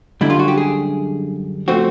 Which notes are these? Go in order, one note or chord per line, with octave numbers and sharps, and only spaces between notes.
F#2 D3 G3 E4
F4
F#4
G4
G#4
C#3 F3 A3 C4 F#4